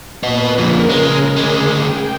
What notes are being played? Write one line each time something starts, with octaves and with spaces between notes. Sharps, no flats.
A#2 B3 B4 D#5
F2 A#2 C#3 A#4
G#3
D2 G#3 G#4
G5